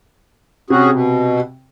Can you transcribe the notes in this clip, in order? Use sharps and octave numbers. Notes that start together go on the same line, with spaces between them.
C3 C#4 F#4 G#4
B2